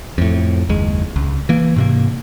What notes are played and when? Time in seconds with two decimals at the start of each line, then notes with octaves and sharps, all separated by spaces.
0.18 F2 A2
0.69 F#1 D#2 G#3
1.16 C#2
1.49 E3 A#3
1.76 G#2 C3 A#3